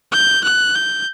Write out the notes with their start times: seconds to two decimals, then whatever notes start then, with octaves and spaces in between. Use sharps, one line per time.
0.12 G6
0.44 F#6
0.75 G6